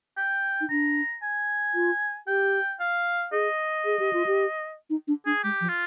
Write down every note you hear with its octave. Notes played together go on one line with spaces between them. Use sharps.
G5
D#4
D4 A#5
G#5
F4
G4 G5
F5
G#4 D#5
G#4
G4
F4
G4
D#4
D4
D4 G#4
G#3 G4
F3
F4